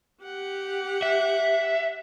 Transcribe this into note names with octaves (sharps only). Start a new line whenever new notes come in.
G4 F#5
E5